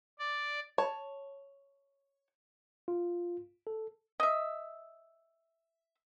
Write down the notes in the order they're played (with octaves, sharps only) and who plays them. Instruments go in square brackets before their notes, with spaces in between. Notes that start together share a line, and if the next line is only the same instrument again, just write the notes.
[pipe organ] D5
[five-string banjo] C#5 A5
[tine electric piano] F4
A4
[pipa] D#5 E5